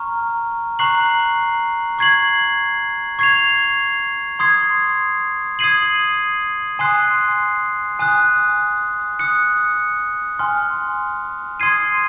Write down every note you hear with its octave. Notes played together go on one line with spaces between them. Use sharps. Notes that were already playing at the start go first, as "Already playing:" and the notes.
Already playing: A#5 C#6 F6
A#5 C#6 F#6 C7 F#7
C#6 G#6 C7 F#7
C#6 G#6 C7 F7
C6 D#6 G#6 C7
D#6 G#6 C7 D#7 F#7
G#5 C6 D#6 F#6 C7
G#5 D#6 F#6
D#6 F#6 C#7
G#5 C6 F6
C6 D#6 G#6 C7 D#7